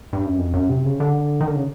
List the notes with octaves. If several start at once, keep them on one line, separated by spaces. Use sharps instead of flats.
G2
F#2
F2
F#2
C3
C#3
D3
D#3
D3
C#3